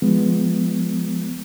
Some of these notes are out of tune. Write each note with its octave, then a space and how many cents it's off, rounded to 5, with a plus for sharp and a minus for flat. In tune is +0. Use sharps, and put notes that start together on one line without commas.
F3 +0 G#3 +0 B3 +5